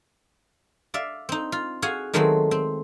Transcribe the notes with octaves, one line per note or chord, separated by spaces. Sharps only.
D5 E5 F5
C4 D#4
F4
F#4 G#4 F5 F#5 G#5
D#3 F#3 G#3 A3 B3 C4
C4